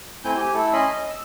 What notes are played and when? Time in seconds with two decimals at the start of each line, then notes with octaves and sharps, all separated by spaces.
0.24 A3 C4 E4 G#5 G6
0.37 G4 G#5
0.54 A3 E4 A4
0.73 C#4 D#5 G#5 B5 C6
0.86 D#5
1.09 E6